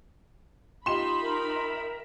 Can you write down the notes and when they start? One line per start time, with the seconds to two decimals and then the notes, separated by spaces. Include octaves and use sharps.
0.86 D#4 F4 G4 D#5 B5 C6 E7
1.21 A#4 E5